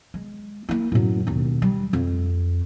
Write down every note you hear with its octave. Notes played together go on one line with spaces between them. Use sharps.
G#3
A#3 E4
F#2 A2
E1 D#2
G3
F2